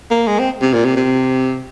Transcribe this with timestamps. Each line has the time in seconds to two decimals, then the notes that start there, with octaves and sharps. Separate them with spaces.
0.10 A#3
0.27 G#3
0.39 C4
0.61 C3
0.73 A#2
0.84 C3
0.96 C3